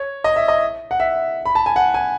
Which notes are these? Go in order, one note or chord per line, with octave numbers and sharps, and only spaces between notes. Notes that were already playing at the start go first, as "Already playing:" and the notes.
Already playing: C#5
D#5
E5
D#5
F#5
E5
B5
A5
G#5
F#5
G#5